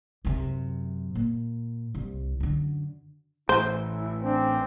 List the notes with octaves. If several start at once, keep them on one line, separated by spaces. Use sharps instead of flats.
F#2 C3
A#2
C2
F#2 D3
A1 A3 E4 C5
C4 D4